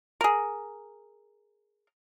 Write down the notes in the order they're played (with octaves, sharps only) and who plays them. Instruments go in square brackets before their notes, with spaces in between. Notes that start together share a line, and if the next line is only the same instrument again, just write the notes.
[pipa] G#4 A#4